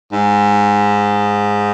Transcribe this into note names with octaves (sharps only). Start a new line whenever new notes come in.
G#2